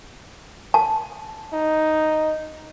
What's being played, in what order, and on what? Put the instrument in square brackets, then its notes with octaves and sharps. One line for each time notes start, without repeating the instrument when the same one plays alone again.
[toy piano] A5
[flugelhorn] D#4